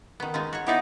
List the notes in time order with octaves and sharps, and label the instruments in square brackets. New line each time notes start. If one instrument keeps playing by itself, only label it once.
[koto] D#3 B3
G#3 D#4 F4
F#4 C#5
[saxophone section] B3 D#4 E4 [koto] G4 C#5 D5